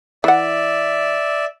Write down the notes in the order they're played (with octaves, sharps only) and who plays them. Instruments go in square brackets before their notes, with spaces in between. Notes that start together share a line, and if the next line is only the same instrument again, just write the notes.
[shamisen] E3 F#5 [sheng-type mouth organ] D5 E5